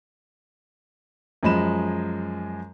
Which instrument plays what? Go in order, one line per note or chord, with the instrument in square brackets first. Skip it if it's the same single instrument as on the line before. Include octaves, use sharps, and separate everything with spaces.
[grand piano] F#2 F3 G#3 B5 E7